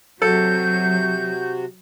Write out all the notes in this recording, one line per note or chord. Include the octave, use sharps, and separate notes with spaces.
C3 F#3 F#4 A4 G6